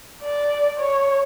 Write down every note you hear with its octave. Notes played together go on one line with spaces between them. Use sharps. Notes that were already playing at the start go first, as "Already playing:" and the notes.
D5
C#5